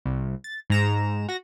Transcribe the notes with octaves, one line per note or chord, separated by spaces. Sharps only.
C2
A6
G#2 A#5 E7
F#4 A#6